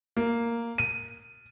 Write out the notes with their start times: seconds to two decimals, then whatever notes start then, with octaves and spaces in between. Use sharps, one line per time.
0.17 A#3
0.78 D#7